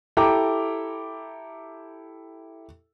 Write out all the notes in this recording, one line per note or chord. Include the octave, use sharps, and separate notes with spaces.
E4 G4 A4 G5 A#5 D6